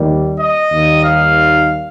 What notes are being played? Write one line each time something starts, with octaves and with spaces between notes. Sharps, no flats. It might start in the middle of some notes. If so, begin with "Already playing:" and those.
Already playing: D#2 D#3 G3
D#5
D#2 D#3 G3 A#3
F5